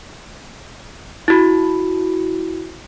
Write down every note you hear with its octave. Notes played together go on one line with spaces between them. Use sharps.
E4 F#4